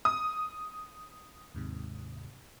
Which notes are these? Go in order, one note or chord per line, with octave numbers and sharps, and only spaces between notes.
D#6
D#2 G#2 C3